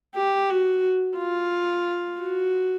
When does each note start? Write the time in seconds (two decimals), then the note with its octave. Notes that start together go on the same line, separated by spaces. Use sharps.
0.15 G4
0.50 F#4
1.18 F4
2.20 F#4